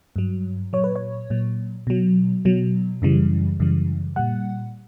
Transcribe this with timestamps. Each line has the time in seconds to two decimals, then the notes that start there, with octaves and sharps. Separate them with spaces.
0.16 G2 F#3
0.73 A#2 F#3 C#5
0.84 B4
0.96 C#5
1.30 A#2 F#3
1.87 B2 F#3
2.45 B2 F#3
3.02 F#2 C#3 E3 G3
3.60 F#2 C#3 E3 G3
4.16 A#2 G3 F#5